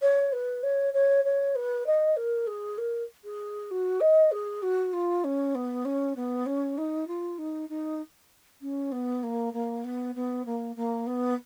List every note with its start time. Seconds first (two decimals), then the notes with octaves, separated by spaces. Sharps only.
0.02 C#5
0.32 B4
0.63 C#5
0.94 C#5
1.25 C#5
1.55 B4
1.86 D#5
2.16 A#4
2.47 G#4
2.78 A#4
3.24 G#4
3.71 F#4
4.00 D#5
4.31 G#4
4.62 F#4
4.93 F4
5.24 C#4
5.55 B3
5.85 C#4
6.16 B3
6.46 C#4
6.77 D#4
7.07 F4
7.38 D#4
7.69 D#4
8.61 C#4
8.92 B3
9.23 A#3
9.53 A#3
9.84 B3
10.15 B3
10.45 A#3
10.76 A#3
11.06 B3